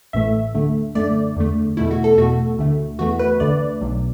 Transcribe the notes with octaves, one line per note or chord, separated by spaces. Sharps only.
A1 A2 E3 A3 E5
D2 D3 A3
F#2 D3 A3 D5
E2 D3 A3
E2 B2 A3 E4
F#4
A4
E2 B2 A3 F#4
D2 D3 A3
E2 E3 A3 F#4
B4
D2 D3 A3 D5
B1 B2 F#3